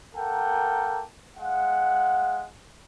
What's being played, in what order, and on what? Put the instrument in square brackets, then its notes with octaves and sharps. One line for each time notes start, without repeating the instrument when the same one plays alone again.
[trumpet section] A#3 A4 A#4 F#5 G5
G#3 F5 F#5